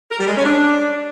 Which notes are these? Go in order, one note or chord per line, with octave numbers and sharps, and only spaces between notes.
A#4
G3
G#3
C#4
D4